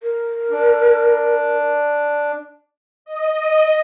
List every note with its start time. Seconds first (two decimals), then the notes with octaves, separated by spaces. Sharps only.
0.01 A#4
0.51 D4
3.05 D#5